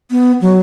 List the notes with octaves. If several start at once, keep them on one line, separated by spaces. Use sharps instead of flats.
B3
F#3